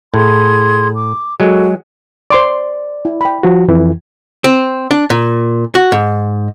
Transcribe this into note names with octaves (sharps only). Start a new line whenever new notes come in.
A2 G#4 C6 G#6
D6
F#3 G#3 F#4 A4
C5 D5 C6 D6
E4
G5 B5
F3 F#4
F2 E3
C4
D4
A#2
F#4
G#2